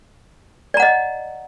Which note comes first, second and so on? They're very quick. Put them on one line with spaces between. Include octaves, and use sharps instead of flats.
D5 A#5 F#5 D#5